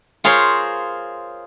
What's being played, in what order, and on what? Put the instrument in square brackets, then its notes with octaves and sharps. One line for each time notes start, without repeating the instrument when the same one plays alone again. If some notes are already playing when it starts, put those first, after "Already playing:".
[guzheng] F4 G#4 A#4 C5 C#5